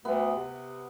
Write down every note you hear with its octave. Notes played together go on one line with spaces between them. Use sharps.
D2 B3
C3